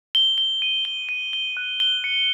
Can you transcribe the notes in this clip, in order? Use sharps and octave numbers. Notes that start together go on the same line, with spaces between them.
G7
G7
D#7
G7
D#7
G7
F#6
G7
C#7